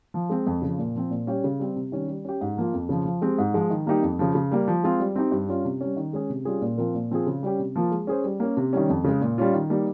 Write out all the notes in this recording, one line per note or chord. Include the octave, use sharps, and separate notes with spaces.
F3
G#3 C4
F2
C#3 F3
A#2
F3 C4
A#2
G3 C#4 G4 C#5
C#3
G3 C4
C3
D#3 G3 C#4
G3
C#4 G4
G#2
F3 A#3 F4
F2
C#3 F3
F3
G#3 C4 G4
G#2
F3 G#3
D#3
G3 A#3 D#4 G4
F2
C#3 F3
C#3
G3 A#3
F3
G#3 C4 F4 G#4
G3
C4 D#4 G4
G2
G3 C#4 F4
C3
G3 C#4
D#3
G#3 C#4 G#4
C3
G3 C#4 F4 G#4
A#2
F3 C4 F4 A#4
A#2
F3 C4 F4 G#4
C#3
G3 C#4 G4
C3
F3 A#3 F4
G#3
C#4 G#4 C5
G3
A#3 C#4
C3
D#3 G3 C#4
F2
C#3 G#3
A#2
G3 C#4 F4
D#3
G3 A#3 D#4